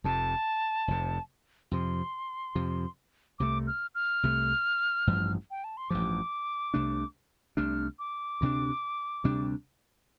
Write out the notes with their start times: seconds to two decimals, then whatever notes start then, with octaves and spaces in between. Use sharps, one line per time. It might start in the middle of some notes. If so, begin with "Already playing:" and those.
0.04 F1 F2 C3 A5
0.88 F1 F2 C3
1.71 F2 C3 F3 C6
2.55 F2 C3 F3
3.39 C2 C3 A3 D6
3.67 F6
3.95 F6
4.23 C2 C3 A3
5.07 A1 G2 F3
5.51 G5
5.64 A5
5.77 C6
5.90 A1 G2 F3 D6
6.74 C2 C3 A3 D4
7.57 C2 C3 A3 D4 F6
7.99 D6
8.41 D2 C3 G3 D4
9.24 D2 C3 G3 D4